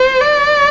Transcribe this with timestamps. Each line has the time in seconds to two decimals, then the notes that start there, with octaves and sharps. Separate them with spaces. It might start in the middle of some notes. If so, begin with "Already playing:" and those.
Already playing: C5
0.22 D5